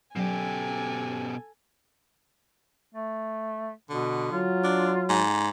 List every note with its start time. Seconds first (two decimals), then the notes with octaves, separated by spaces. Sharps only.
0.16 B2 F#3 C#4 G4 A4 D5 G#5
2.94 A3
3.90 B2 D3
4.32 F#3 F4
4.64 D4
5.10 G#2